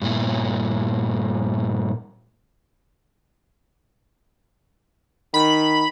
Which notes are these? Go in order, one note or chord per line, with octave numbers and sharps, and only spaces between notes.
G2 A#2 E4
D#3 B5